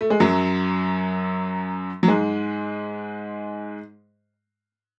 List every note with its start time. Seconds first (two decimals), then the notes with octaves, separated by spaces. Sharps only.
0.01 A3
0.10 G#3
0.20 F#2 F#3
2.03 F#3
2.08 G#2 G#3